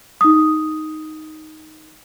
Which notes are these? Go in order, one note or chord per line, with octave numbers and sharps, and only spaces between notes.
D#4 D#6